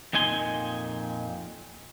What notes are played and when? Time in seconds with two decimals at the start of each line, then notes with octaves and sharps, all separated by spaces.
0.13 F2 A#2 D#4 G#5 C6